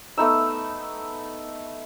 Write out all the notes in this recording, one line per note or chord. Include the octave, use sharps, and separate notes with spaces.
A3 B3 D#4 E6